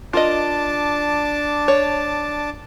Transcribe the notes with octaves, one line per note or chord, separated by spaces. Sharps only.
D4 F4 A#4 D#5 A5 D6
C#5